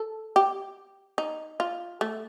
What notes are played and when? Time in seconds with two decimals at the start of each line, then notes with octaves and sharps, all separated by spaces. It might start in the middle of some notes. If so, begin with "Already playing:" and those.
Already playing: A4
0.36 G4
1.18 D#4
1.60 F4
2.01 A3